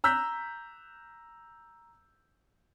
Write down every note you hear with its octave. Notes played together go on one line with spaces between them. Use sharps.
A#5 E6 F#6 G6 B6